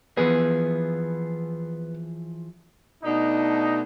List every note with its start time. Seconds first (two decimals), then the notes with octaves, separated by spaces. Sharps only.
0.17 E3 F3 B3 G#4
3.04 B2 A3 D4 D#4